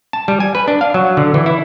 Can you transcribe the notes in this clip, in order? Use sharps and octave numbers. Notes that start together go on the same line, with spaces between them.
A5
G3
G#5
B4
D4
F5
F#3
D3
E3
E4